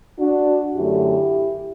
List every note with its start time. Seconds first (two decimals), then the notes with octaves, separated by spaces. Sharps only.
0.19 D4 F#4
0.76 F#2 D3 A3 E4 G4